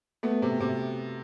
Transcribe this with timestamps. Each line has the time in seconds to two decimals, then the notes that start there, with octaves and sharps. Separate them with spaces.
0.23 A3 B3
0.42 C3
0.60 C3